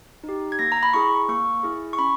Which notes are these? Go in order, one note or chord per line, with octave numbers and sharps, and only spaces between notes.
D#4
G4
G#6
A#3 A#6
A#5
B5
E4 G#4 C#6
A#3 C#6
E4 G#4
C#6
C#4 B5